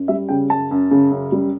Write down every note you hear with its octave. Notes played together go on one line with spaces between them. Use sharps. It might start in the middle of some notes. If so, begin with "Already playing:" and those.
Already playing: F#2
G3 E5
C#3 G5
F#2 A5
F#2
C#3
F#2
G3